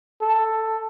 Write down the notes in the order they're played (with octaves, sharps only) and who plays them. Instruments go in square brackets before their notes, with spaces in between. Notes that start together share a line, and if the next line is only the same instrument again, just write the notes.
[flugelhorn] A4